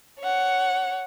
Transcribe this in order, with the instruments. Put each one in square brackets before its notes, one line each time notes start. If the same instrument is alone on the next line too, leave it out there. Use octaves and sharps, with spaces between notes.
[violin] C#5 F#5